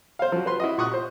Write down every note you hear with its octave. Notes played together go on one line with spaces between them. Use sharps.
C5 F5
F3 F#3
B4 C6
E4 F#4 D#5
A#2 C#6 D#6 F#6
C5